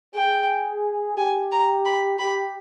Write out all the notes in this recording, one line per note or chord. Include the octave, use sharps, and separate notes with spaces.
G#4 G5
G4 G#5
A#5
B5
G4 B5